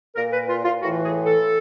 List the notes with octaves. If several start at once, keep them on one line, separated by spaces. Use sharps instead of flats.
A#2 A#4
B4
F4
F4
A2 E3 F#4
G#4
A4